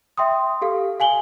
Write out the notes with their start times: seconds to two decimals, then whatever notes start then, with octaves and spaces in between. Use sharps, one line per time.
0.17 E5 G5 C6 D#6
0.61 G4 A4 F5
1.00 F5 G#5 F#7 G7